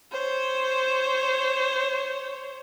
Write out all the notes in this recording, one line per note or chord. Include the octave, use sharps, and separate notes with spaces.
C5 C#5